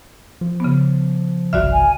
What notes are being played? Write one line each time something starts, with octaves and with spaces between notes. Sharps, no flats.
F3
C#3 B3
G1 C2 F#4 D5 E5 F6
G#5